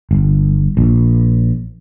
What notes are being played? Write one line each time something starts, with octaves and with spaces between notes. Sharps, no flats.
G1
A#1